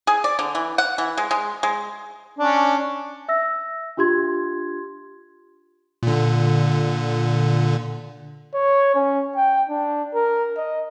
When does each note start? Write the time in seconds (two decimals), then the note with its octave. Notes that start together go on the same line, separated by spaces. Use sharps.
0.07 G#4
0.24 D5
0.39 D3
0.55 E3
0.78 F#5
0.98 E3
1.18 G#3
1.31 G#3
1.63 G#3
2.39 C#4 D4
3.28 E5 E6 A#6
3.97 D4 F4 G4 C6 G#6
6.03 A#2 D3
8.55 C#5
8.95 C#4
9.36 G5
9.70 D4
10.15 A#4
10.57 D#5